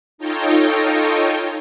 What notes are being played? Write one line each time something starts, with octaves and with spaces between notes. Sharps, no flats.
D#4 F4 A4 C#5 D#5 G5